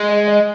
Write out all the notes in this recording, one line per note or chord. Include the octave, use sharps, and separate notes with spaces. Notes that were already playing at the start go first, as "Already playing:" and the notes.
Already playing: G#3
D#5
D#5